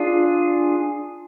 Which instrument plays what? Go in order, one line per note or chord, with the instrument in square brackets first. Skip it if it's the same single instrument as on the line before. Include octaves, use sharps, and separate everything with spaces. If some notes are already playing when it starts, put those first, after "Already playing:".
Already playing: [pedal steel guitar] D4 F4 G#4